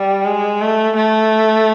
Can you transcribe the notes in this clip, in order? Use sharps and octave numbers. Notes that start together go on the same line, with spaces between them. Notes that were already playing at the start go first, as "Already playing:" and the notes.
Already playing: G3
G#3
A3
A3